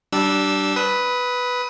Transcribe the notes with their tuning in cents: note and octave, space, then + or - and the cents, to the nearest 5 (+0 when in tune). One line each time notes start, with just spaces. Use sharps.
G3 -20 D4 +0 E6 +0
B4 +0 D#6 +30